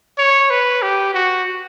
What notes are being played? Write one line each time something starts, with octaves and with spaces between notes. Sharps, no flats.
C#5
B4
G4
F#4